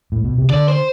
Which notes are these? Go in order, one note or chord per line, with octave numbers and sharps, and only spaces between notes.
A2
B2
C3
D3 D5
C5